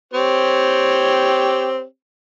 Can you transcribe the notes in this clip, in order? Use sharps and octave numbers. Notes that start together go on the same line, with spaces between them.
C4 G4 C#5